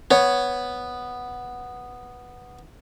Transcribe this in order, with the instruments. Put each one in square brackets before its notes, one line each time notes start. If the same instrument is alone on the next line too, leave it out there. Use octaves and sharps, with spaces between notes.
[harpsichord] B3 [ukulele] C#5